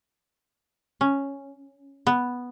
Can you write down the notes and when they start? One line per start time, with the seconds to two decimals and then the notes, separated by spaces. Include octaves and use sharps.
1.01 C#4
2.07 B3